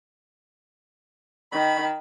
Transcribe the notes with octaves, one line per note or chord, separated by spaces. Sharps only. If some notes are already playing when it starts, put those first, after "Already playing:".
D#3 B5